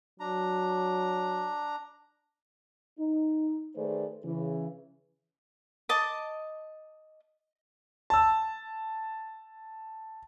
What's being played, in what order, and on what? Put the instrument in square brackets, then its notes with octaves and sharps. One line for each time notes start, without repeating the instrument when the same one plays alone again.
[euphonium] F#3 [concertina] D4 A#5
[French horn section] D#4
D#3 A3 G#4 B4 C5 D5
C#3 E3
[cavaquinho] D#5 A5 D6
[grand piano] A5 E6